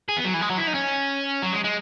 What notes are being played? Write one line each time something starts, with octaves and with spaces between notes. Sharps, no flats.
G#4
B3
F#3
E3
G#3
F#3
E4
D#4
C#4
F#3
G#3
G#3